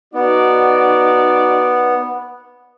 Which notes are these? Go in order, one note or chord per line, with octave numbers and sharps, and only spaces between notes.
B3 D#4 F#4 D5